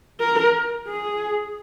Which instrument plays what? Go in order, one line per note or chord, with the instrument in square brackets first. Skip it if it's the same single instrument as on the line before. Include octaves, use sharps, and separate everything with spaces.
[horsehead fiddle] A#4
G#4